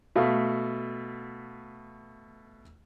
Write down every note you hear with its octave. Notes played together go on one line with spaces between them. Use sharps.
B2 A3 F5